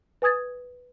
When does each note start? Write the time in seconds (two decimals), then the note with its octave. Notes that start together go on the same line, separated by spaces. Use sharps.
0.22 B4 G#5 D#6 G#6 A6